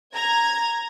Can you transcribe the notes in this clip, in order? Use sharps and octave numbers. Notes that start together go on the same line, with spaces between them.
A#5 G#6